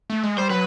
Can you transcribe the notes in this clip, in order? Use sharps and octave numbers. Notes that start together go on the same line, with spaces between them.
A3
G#3
G3 C5
F#3 B4